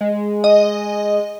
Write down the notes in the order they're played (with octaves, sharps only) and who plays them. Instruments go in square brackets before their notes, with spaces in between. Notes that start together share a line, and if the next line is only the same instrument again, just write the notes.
[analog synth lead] G#3
[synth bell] D#5